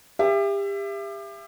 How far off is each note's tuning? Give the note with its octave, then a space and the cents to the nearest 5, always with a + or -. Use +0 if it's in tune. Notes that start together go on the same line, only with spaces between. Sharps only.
G4 +30 E5 +25